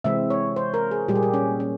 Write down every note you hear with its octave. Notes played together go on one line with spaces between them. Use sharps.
C3 E3 G#3 C4 E5
C#5
C5
A#4
G#4
A#2 G3 A#3 G4
G#4
G4
C#4
C#4